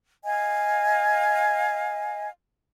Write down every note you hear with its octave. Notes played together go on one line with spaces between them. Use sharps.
D#5 F5 G#5